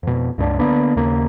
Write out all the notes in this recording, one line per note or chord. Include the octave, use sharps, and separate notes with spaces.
F2 B2
C#2 G2 A3 D4
D3 A#3 B3 D4
D#2 C#3 A#3